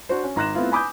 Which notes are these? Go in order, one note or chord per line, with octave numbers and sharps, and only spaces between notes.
D4 F#4 C5
C#4
G#1 A#5 C6 F#6 A#6 E7
A3 B3 C4 E4 F4
G#5 B5 D6 D#6 G6